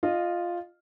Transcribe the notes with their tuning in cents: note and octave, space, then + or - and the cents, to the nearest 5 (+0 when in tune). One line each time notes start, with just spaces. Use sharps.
F4 +0 D#5 -20